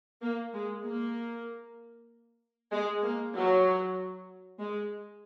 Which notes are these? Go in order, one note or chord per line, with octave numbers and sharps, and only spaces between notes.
A#3
G#3
A#3
G#3
A#3
F#3
G#3